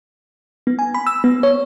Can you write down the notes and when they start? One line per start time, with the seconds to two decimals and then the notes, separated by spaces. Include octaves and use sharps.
0.67 B3
0.79 G#5
0.94 B5
1.07 E6
1.24 B3
1.43 C#5